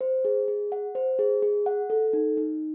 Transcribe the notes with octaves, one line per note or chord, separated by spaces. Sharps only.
C5
G#4
G#4
F#5
C5
G#4
G#4
F#5
A4
D#4
D#4